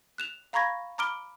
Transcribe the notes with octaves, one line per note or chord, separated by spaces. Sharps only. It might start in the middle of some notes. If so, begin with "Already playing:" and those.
F#6 E7 F7
F5 A#5 B5 C#6 G#6 A#6
A#5 B5 D6 F6 D7 G7